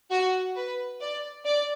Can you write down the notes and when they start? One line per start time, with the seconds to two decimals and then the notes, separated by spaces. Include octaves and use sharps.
0.10 F#4
0.55 B4
1.00 D5
1.45 D5